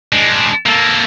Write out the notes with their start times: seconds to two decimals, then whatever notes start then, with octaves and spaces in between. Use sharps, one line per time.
0.13 G#3 D4
0.66 A#3 A4